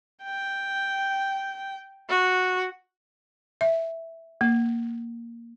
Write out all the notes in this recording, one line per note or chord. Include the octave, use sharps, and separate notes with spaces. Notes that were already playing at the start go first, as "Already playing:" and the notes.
G5
F#4
E5
A#3